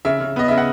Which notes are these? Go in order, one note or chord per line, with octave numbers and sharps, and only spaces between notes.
C#3 E5
C#3
B3 D#5
C#3 E5
F#5